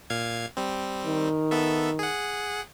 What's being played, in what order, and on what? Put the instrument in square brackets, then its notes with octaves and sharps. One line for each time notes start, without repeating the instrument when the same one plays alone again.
[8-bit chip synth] A#2 F5 G#6
G3 C4
[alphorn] D#3
[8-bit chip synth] B3 A4 E5
G#4 F#5